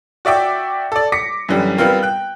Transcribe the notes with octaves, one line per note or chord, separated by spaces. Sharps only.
F#4 D5 E5 G5 D6
A4 D5
D6 A#6 B6 C#7
F#2 D3 E3 G3
G3 B3 C4 F4 A#4
G5 F#6